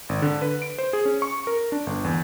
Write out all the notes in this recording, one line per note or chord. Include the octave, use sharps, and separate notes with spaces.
G#1
D3
B4
D7
C5
G#4
C#4
C#6
A#4
D4
G1
E2